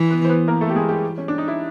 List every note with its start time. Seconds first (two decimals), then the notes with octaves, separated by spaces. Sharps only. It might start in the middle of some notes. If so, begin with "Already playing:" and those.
Already playing: E3
0.10 B3 B4
0.25 C5
0.29 B3 B4
0.48 A#3 A#4
0.61 A3 A4
0.69 G4
0.76 G#3 G#4
0.89 G3 G4
1.18 C#4
1.28 D4
1.38 D#4
1.48 E4